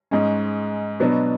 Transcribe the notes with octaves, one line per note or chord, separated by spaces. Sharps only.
G#2 G#3 C#4
B2 F#3 B3 D4